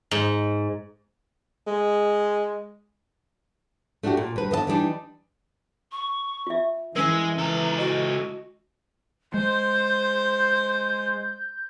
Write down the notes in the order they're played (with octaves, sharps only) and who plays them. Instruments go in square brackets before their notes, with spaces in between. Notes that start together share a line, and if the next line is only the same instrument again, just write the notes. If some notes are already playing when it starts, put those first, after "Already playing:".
[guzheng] G#2
[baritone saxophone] G#3
[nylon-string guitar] A3 D4 E4 F#4 G4
A#2
G2 B4
D3 B3 D#5 A5
E3 G3 A3 D4 D#4
[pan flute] C#6
[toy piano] F4 E5
[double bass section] E3 [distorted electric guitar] G#3 [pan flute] C#4 [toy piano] A#4
[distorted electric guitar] C#2 A4 [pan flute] A#5
[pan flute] F#4 [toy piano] D#5
[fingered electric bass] G#3 [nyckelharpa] C5 [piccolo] G6